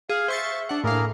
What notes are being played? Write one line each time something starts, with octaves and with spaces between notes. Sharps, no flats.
G#4 F5
C5 E5 C#6 A6
D4 F#5
A2 A#3 G#4 A#4 F5